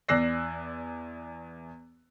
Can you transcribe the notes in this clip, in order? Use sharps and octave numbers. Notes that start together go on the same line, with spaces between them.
E2 D5 E6 F#6 A#6 C7